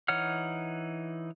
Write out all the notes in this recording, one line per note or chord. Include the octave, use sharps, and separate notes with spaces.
E3 D#4 C#5 F#5 F6